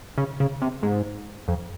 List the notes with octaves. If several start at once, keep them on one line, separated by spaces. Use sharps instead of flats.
C#3
C#3
C3
G#2
F2